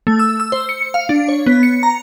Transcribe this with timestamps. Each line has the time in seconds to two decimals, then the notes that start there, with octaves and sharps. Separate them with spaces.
0.07 A3
0.19 E6
0.40 E6
0.52 C5
0.69 C#7
0.94 F5
1.09 D4
1.29 C#5
1.46 B3
1.63 C#7
1.83 A#5